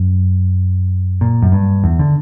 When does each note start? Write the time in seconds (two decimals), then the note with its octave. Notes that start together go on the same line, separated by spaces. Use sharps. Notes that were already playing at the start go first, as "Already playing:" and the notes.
Already playing: F#2
1.21 A#2
1.43 F#2
1.52 G2
1.84 E2
1.99 D3